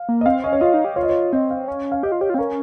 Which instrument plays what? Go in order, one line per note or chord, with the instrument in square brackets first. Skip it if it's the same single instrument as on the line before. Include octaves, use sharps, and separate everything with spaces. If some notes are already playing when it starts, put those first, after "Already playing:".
Already playing: [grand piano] F5
[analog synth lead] A#3
[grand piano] D#5
[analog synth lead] C4 [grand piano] F5
[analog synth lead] C#4 [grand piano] D#5
[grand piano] C#5
[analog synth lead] F4 [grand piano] D#5
[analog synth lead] D#4
G4
[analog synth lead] F4 [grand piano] C#5
[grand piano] D#5
C#5
[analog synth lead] C4 [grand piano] D#5
[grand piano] F5
[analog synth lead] C#4
[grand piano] F5
[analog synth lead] G4 [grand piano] D#5
[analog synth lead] F4
[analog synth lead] G4 [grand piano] C#5
[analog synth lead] F4
C4
[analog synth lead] C#4 [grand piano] A#4